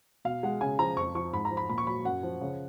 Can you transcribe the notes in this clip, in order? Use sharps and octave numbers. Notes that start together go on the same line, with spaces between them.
B2 F5
G#3 F#5
C#3 G#5
F3 A#5
F2 C#6
F3 C#6
G#2 B5
A#5
F3
B5
A#2 B5
C#6
F#3 B5
F#2 F#5
F3
C#3